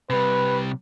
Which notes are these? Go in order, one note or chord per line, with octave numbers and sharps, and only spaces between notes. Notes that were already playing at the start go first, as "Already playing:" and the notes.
C3 G3 B4